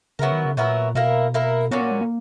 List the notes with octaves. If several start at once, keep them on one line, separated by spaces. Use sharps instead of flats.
C#3 F#3 B3 E4 A#4
D#3
C#3
A#2 F#3 B3 E4 A#4
B2 A#3 E4 A#4
A#3 E4 A#4
A#2 F#3 B3 C#4
A#3
G#3
A#3